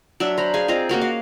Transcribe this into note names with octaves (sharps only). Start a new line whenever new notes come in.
F#3 D4 D5 E5
C5 A#5 B5
G#4 F5 G#5
C4 F4 D#5 A#5
A#3 C#4 F#4 A#4
F5